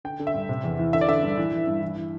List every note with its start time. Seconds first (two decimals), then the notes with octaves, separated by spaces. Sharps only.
0.04 D3 G5
0.20 D3
0.27 E5
0.34 G2
0.49 C3
0.64 E2
0.79 E3
0.93 D3 E5
1.01 D5
1.08 D3 E5
1.23 G2
1.38 E3
1.52 E3
1.67 G2
1.82 E3
1.97 E3